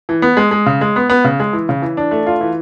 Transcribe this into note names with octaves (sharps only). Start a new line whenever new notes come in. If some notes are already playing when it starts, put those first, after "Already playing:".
E3
B3
G#3
G#3
C#3
G#3
B3
B3
C#3
G#3
E3
C#3
E3
D4
A3
F4
E3